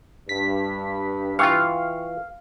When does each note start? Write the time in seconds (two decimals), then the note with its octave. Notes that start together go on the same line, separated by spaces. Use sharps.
0.29 G2 B6
1.39 E3 F4 F5 G5 C#6 C#7